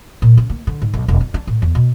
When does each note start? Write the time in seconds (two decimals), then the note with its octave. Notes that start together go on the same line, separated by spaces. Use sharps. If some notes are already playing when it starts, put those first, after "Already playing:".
0.22 A#2
0.37 C#3
0.50 A#3
0.67 D3
0.82 G#2
0.94 B1
1.08 E1
1.21 F2
1.34 D4
1.47 A2
1.62 E2
1.75 B2